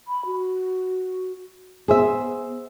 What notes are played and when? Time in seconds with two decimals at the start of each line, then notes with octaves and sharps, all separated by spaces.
0.08 B5
0.26 F#4
1.88 B3 G#4 C5 E5